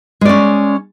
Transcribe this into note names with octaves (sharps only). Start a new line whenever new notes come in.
G#3 C#4 D5